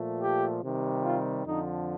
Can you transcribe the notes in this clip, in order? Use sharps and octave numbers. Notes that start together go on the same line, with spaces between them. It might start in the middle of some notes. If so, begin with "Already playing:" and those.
Already playing: A#2 F3 A3
G4
C3 D#3 G3
F4
F2 D3 F3 D#4